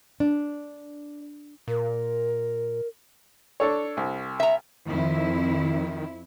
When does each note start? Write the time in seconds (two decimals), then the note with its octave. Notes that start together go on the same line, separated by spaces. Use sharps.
0.20 D4
1.68 A#2 A#4
3.60 D4 A4 C#5
3.97 C2
4.40 E5 A#5
4.86 F2 D#3 E4